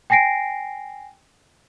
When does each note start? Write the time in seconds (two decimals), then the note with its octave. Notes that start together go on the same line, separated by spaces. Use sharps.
0.10 G5 G#5 A#6 C7 D7